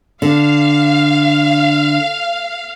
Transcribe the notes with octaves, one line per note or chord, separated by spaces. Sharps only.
D3 F5